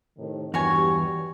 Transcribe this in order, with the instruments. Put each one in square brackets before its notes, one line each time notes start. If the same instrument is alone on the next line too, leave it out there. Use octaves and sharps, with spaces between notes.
[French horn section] A2 C3 D#3
[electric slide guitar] E2 [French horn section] G2 G4 [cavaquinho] F#4 C#5 G#5